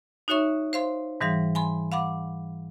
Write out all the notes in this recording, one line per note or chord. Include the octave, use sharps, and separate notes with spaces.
D#4 F#4 C#5 E5 C#6
C5 F5 C6
G#2 E3 G3 F5
G#5 B5 C6
F5 F#5 B5 D6